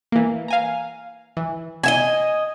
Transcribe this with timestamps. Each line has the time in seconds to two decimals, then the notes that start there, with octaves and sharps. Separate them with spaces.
0.12 E3 A#3
0.48 F5 G#5 A#5
1.37 E3
1.84 D#5 E5 G#5